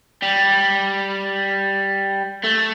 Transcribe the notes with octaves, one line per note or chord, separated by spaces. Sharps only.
G3
A3